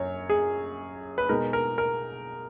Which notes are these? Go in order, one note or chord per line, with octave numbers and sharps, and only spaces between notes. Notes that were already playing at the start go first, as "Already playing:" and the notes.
Already playing: F#2 C#5
G#4
B4
B2 G#3 D#4 A#4
A#4
A#4